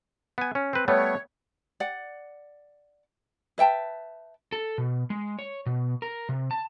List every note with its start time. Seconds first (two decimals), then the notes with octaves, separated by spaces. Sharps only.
0.38 B3 G#5
0.55 C#4
0.73 C4 B4
0.88 G3 A3 B3 C#5
1.80 D5 F#5
3.58 B4 E5 G5 A5
4.52 A4
4.78 B2
5.10 G#3
5.39 C#5
5.66 B2
6.02 A#4
6.29 C3
6.51 A5